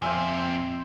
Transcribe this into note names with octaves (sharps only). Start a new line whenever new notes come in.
F2 A#2 C4 C5 E5 G#5